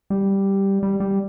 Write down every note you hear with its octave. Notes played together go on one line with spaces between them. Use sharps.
G3
G3
G3